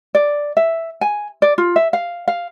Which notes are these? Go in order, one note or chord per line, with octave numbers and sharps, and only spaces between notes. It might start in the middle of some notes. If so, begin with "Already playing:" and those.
D5
E5
G#5
D5
F4
E5
F5
F5